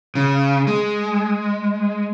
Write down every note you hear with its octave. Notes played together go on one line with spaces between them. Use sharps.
C#3
G#3